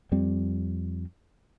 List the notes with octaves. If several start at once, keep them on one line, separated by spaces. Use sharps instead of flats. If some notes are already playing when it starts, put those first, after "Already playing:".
F2 G3 C4